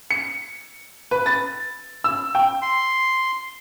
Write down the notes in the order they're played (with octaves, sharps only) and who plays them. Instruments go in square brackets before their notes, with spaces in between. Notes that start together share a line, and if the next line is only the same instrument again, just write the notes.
[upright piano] C#7
B4
A6
E6
G5
[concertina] C6